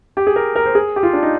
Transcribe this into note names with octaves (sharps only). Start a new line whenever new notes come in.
G4
G#4
A#4
A#4
C5
G#4
G4
F4
D4
D#4